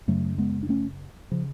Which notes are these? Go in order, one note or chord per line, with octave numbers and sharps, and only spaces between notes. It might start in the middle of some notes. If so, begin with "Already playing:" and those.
F#2 C#3 F#3 A3
G#3 B3
D4
A3 C#4
C#3 F3